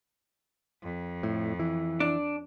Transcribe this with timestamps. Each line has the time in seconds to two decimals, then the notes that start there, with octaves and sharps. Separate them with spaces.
0.82 F2
1.23 A2
1.59 E3
2.00 D4